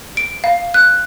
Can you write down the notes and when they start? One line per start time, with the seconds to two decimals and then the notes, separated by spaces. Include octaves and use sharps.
0.17 D7
0.44 F5
0.74 F#6